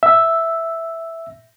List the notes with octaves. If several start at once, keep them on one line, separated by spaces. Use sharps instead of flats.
E5